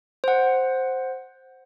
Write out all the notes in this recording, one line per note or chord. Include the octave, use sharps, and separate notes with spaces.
C5 F#5